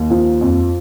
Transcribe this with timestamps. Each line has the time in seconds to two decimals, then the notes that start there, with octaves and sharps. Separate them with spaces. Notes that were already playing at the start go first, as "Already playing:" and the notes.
Already playing: D#2
0.10 F3
0.41 F2